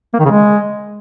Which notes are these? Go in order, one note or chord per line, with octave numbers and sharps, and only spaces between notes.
A#3
D#3
C#3
G#3